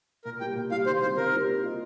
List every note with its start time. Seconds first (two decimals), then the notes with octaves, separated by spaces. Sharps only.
0.25 A#2 A#4
0.40 G3 A#3 G5
0.56 A#2
0.71 G3 A#3 F5
0.86 D#3 C5
1.01 G3 C5
1.05 C4
1.17 D#3 A#4
1.32 G3 C4
1.47 A#3
1.63 F4 D#5